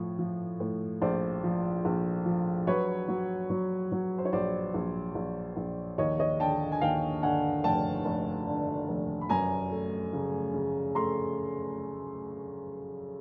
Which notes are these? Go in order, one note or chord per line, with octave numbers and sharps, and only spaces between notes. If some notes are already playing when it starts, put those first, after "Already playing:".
Already playing: A2 F3
F3
A2
A#1 C5 D5
F3
A#1
F3
F#3 B4 C#5
F#3
F#3
F#3
C5
C#5
A#1 C5 D5
A#1
A#1
A#1
D#2 C#5 D#5
C#5 D#5
D3 G5 A5
G#5
D#2 F5 G5
D3 F#5 G#5
F1 G5 A5
F1
D3
F1
B5
F#2 G#5 A#5
A3
C#3
C#3
A3 A#5 C6